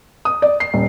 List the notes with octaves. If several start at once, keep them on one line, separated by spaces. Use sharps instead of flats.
D#6
D5
C7
D#1